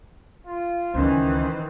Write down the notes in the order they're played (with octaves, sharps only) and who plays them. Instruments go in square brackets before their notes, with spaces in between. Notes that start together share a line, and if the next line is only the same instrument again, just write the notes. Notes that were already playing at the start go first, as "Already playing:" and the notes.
[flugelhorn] F4
[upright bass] C#2 [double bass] D#3 E3 [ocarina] C#4 [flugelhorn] C5